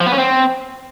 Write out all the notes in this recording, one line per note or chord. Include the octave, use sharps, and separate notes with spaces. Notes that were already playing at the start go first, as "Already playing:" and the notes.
F3
B3
C#4
C4